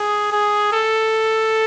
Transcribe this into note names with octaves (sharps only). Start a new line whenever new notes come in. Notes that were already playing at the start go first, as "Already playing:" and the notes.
Already playing: G#4
G#4
A4